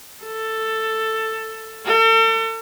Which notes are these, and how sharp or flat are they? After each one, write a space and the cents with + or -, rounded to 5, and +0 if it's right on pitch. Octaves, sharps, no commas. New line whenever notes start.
A4 +10
A4 +40